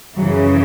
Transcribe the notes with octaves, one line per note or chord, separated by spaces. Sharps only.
F#2 C#3 E3 F#3